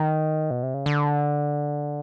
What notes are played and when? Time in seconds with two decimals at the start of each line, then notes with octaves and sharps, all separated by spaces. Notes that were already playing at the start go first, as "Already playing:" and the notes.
Already playing: D#3
0.51 B2
0.63 C3
0.74 C#3
0.86 D3